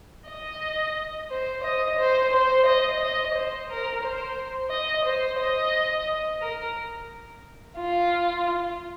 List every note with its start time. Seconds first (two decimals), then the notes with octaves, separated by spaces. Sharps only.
0.29 D#5
1.30 C5
1.64 D#5
1.99 C5
2.33 C5
2.66 D#5
3.01 D#5
3.34 C5
3.69 A#4
4.03 C5
4.71 D#5
5.05 C5
5.40 D#5
6.41 A#4
7.77 F4